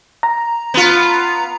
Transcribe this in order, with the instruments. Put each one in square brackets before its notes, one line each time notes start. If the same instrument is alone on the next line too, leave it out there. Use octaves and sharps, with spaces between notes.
[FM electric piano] A#5
[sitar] B3 F4